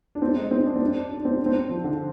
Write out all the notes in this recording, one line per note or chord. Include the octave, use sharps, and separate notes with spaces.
D4
C4
G#3
C4
D4
C4
D4
D4
C4
D4
C4
F3
D3